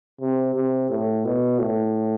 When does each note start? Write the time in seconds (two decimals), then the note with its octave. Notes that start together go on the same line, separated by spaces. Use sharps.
0.20 C3
0.55 C3
0.90 A2
1.24 B2
1.59 A2